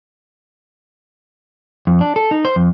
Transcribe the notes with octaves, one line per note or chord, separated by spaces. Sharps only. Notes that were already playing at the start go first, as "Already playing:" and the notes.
F2
D4
A4
D#4
C5
F2